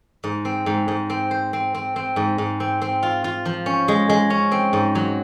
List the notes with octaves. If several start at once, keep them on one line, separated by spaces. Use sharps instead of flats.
G#2
C4
G#2
G#2
C4
C5
C4
C4
C4
G#2
G#2
C4
C4
F4
F4
F3
C#4
G#3
G#3
C#4
C4
G#2
F#3